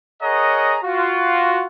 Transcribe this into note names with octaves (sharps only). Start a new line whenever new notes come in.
G#4 A#4 C#5 D#5 F#5 A#5
F4 F#4